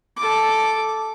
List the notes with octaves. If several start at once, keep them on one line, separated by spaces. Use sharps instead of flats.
A4 D6